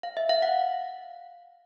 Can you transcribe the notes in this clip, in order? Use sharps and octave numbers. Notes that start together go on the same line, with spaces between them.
F5
E5
F5
F#5